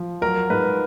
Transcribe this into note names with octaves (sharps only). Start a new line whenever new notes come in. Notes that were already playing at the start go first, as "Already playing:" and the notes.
Already playing: F3
F#3 A#4
G#2 B4